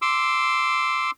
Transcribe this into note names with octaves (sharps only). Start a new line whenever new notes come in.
C6 D6 E6